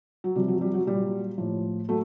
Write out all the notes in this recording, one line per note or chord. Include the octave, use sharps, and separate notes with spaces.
F#3
C3 F3 G3
F#3
G3
F#3
A#2 F#3 G3
A2 F3
F#3 A3